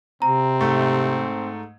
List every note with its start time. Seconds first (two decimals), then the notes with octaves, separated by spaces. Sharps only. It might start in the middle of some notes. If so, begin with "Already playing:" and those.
0.22 C3 C4 A#5
0.60 G#2 A3